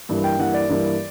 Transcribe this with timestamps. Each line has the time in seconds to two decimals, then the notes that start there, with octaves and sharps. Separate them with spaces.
0.09 G2 E3 A#3
0.24 G5
0.39 G2 E3 A#3 F#5
0.54 D5
0.69 G2 E3 A#3